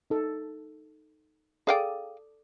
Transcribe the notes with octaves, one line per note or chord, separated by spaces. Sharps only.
D#4 A4
G#4 A4 D5 F5 G5 D#6